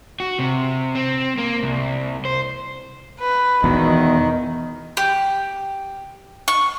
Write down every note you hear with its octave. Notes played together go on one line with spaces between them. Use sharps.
F#4
C3
C4
A#3
C2
C5
B4
E2 B2 D#3
G4
C#6